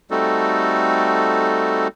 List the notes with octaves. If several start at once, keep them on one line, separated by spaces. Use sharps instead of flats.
G3 A3 C4 D#4 F#4 A4